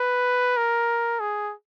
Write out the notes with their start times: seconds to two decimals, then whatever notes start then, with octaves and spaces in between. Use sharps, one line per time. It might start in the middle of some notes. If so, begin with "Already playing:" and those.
Already playing: B4
0.57 A#4
1.20 G#4